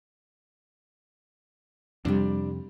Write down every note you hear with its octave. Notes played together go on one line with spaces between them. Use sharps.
F2 C3 G3 D4